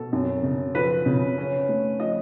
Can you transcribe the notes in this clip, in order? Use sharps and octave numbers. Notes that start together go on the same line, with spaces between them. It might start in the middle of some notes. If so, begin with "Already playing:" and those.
Already playing: B2 A4
F#2
C#3
F3 B4
C#3
C#4
A3
F3 D#5